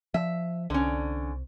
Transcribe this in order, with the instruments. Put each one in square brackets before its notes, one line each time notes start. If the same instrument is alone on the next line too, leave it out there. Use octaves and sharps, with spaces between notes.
[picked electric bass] F3 [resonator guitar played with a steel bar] E5
[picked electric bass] C2 [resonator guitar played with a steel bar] D3 C#4